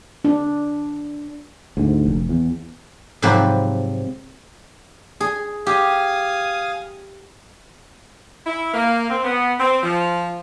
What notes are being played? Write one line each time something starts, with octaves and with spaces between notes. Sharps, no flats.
D4
D2 G#2
F1
E2
G#2 C3 F3 F#3 C4 B4
G#4
G4 F5 G#5 D#6
E4
A#3
C4
B3
C4
F3